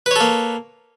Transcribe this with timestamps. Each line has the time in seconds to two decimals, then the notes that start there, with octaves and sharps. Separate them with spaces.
0.06 B4
0.11 C#5
0.16 A4
0.20 A#3